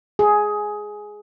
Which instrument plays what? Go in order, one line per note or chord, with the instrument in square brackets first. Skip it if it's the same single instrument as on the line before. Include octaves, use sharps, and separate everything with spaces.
[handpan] G#4